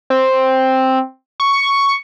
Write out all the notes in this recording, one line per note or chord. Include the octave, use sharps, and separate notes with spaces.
C4
C#6